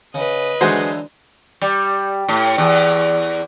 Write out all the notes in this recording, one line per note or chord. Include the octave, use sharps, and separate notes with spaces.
C#3 B4 D#5
D3 E3 F#3 G#3 F#4 C5
G3
A2
E2